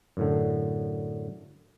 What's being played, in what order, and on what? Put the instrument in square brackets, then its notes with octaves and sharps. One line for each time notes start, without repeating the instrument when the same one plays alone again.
[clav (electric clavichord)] F#2 A2 D3